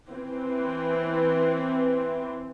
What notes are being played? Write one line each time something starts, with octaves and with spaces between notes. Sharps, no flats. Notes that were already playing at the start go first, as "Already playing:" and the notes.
E3 C4